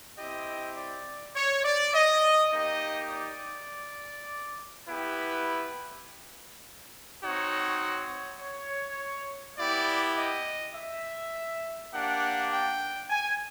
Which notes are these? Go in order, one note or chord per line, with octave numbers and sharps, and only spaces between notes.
C4 E4 G4 D#5
D5
C#5
D5
D#5
A#3 D#4 G4 D#5
D5
B3 E4 G4 B4
C4 D#4 F#4 C#5
C#5
C#5
B3 E4 G4 D5
D#5
E5
A#3 D4 G4 F#5
G5
G#5